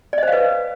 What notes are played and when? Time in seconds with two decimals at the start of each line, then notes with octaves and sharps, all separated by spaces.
0.13 D5
0.18 D#5
0.23 C5
0.28 F5
0.33 B4